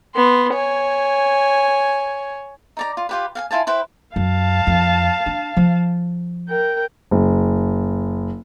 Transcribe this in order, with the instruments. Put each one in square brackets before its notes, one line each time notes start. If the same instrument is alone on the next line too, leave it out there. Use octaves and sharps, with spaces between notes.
[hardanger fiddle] B3 C6
C#5 G#5
[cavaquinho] D#4 D5 A#5
F4
F4 G4 B4
F5 F#5 G#5
E4 F4 G#5 A5
E4 B4 C5 G5
[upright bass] F#2 [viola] F5 A5
[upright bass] F2
D4
F3
[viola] A#4 G5
[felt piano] F#1